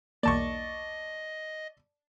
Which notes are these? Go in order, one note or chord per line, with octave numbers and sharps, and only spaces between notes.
B1 E2 A#3 D5 D#5 A5 C#6